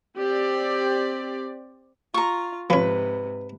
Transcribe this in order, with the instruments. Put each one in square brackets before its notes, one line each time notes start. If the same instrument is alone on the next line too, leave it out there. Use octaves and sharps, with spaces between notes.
[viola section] C4 G4 D5
[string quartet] F4 [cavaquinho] A#5 C#6
[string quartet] G#2 C3 [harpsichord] F3 C#4 [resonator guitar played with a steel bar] B4